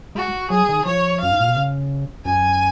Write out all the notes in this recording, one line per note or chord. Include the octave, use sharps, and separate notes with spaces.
G#3 F#4
F#3 G#4
D#3
F3 C#5
F#2 F5
G#2
A#2
B2
C#3
F#2 G#5